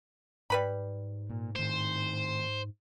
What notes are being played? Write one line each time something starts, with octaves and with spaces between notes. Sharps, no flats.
G#2 G3 B4 B5
A#2
A2 D#3 C5